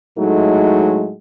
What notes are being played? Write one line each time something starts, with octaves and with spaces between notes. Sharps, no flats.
A2 F#3 G#3 A3 D#4